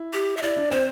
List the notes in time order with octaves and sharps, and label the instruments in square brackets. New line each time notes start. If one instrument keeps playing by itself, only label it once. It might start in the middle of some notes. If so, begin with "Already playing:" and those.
Already playing: [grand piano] E4
[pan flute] G4
E5
[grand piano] E4 [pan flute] D5
[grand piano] D4
[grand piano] C4 [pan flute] C5